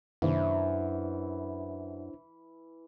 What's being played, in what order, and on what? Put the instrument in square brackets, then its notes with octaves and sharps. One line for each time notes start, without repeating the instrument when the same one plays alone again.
[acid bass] F#2 [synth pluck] C3 D#3 A#3 [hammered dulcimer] E3 [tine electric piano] D4 E4 C5